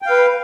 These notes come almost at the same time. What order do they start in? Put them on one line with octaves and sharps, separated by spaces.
G5 F5 B4